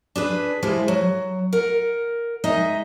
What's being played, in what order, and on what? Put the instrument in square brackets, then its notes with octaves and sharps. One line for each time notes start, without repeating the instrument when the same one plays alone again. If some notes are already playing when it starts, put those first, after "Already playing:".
[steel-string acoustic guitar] D4 G#4 B4
F3 G#3 E4 G4
F#3
A#4 F#5
G#3 D#4 D#5 E5